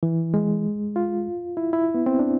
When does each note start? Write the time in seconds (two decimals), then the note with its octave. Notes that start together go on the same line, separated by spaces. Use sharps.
0.03 E3
0.34 G#3
0.96 F4
1.57 E4
1.73 E4
1.95 B3
2.06 C4
2.19 D4